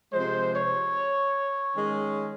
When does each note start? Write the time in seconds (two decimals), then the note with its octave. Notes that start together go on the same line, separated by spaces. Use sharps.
0.13 C3 F3 G#3 C5
0.54 C#5
1.76 D#3 G#3 C#4